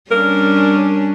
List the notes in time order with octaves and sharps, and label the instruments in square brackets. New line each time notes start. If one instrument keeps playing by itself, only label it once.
[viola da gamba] G3 C#4 D4 [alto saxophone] A#4